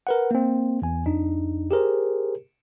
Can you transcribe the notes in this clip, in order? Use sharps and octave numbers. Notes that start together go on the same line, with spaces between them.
A#4 B4 F#5
A#3 C4
E2 G#5
F2 D4 D#4
G4 G#4 A#4 C5